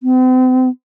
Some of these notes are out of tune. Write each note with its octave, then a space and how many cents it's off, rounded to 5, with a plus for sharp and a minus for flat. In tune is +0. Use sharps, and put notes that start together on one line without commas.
C4 -40